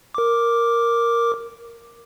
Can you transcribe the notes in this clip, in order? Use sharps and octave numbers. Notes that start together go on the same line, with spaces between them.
A#4 D6